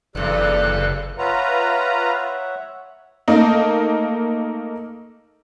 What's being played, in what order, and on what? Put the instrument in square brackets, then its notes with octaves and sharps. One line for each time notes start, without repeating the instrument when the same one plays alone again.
[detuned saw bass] F#1 [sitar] E2 G2 [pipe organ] C3 A4 F#6 [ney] D5
[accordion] F4 B4 A#5 [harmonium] C#5 E5 F#5
[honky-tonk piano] A3 A#3 D#4